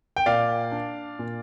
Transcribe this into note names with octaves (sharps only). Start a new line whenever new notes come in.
G5
A#2 D5 F5
D4
A#2